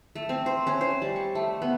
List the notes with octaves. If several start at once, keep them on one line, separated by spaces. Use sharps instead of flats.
A3
C4
C5
C#4
C5
G3
C#6
A3
B3